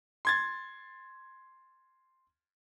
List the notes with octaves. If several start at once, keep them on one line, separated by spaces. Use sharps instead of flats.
C6 G#6 A6